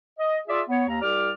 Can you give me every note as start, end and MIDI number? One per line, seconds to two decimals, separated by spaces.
0.19 0.37 75
0.48 0.61 65
0.48 0.61 68
0.48 0.61 74
0.48 0.61 76
0.69 0.83 59
0.69 0.83 73
0.88 0.99 39
0.88 0.99 82
1.01 1.30 36
1.01 1.30 67
1.01 1.30 74
1.01 1.30 86
1.01 1.30 89